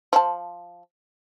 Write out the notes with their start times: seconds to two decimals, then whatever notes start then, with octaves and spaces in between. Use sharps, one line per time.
0.13 F3 A5